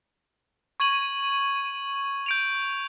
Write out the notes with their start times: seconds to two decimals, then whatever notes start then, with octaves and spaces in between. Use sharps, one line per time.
0.80 C#6 G#6 D#7 F#7
2.26 G6 D7 F7